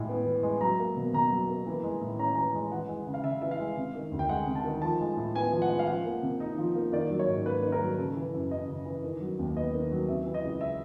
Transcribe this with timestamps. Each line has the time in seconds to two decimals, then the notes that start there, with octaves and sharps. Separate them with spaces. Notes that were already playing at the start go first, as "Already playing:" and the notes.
Already playing: A2 G#3
0.09 B3
0.26 E3
0.43 G#3
0.61 F#3 A#5
0.79 A#3
0.97 B2
1.13 B2 A#5
1.31 F#3
1.48 A#3
1.67 E3
1.83 G#3
2.01 A2
2.19 C#4 A#5
2.35 E3 A#5
2.55 G#3
2.72 E3 F#5
2.89 G#3
3.07 C#3
3.14 F5
3.24 C#3 E5
3.42 E3 E5
3.51 F5
3.60 G#3
3.77 C3
3.95 D#3
4.12 D2
4.19 G5
4.29 G#3 F#5
4.47 C3
4.55 A5
4.64 D#3
4.82 F3 A5
5.00 G#3
5.17 A2
5.35 B3 G#5
5.52 F3
5.62 F#5
5.69 G#3
5.79 F5
5.87 F3 F#5
6.05 A#3
6.22 C3
6.40 D#4
6.58 F3
6.75 A#3
6.92 D#3 D5
7.10 F#3
7.19 C#5
7.28 G#2
7.46 A#3 B4
7.63 D#3
7.72 A#4
7.81 F#3
7.98 C#3 A4
8.16 E3
8.34 F#2
8.50 F#2 D#5
8.69 C#3
8.85 E3
9.03 D#3
9.21 F#3
9.39 D#2
9.56 B3 D#5
9.73 D#3
9.91 F#3
10.08 C3 E5
10.26 E3
10.34 D#5
10.44 C#2
10.61 E5